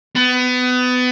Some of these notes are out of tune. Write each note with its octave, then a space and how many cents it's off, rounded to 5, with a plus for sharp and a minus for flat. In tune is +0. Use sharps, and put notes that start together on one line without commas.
B3 +25